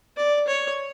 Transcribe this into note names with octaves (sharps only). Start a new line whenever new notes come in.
D5
C#5